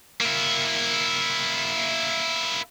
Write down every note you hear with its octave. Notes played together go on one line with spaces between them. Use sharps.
A#3 E4